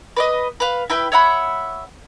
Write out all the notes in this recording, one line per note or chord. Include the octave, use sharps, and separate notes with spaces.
B4 D5 D#5
B4 F5
E4 B4 G5 B5
C#5 E5 F#5 B5